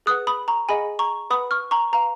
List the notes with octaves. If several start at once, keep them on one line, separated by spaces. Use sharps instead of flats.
G#4 B4 F#5 D#6 F#6
B5 D#6
A#5 C#6
G#4 D#5 F#5 G#5 B5
A#5 C#6
B4 F#5 B5 D#6
C#6 F6
A#5 C#6
B4 F5 A#5